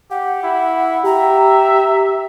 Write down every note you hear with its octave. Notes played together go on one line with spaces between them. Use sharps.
G4 F#5
E4
G4 E5 A#5